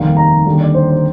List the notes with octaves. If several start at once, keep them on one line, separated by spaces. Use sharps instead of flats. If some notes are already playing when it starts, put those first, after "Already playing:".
Already playing: F1 D#2 D#3 G3 F5
A#5
D#2 D3 G3
D5
C5
C5